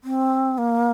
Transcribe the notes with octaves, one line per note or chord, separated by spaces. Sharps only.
C4
A#3